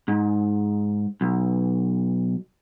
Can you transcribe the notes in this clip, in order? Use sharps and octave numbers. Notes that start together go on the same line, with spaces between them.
G#2
B1